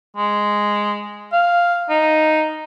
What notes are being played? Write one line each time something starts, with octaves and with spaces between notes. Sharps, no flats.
G#3
F5
D#4